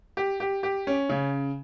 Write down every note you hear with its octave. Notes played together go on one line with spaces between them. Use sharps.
G4
G4
G4
C#4
C#3